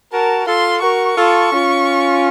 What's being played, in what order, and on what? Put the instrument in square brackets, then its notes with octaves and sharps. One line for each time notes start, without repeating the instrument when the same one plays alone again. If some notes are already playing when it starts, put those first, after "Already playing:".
[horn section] F#4 A#4 [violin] A5
[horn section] F4 A4 [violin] C6
[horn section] F#4 A#4 [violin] C#6
[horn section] F4 A4
C#4 F4